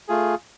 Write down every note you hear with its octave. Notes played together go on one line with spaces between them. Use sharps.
A3 F4 G#4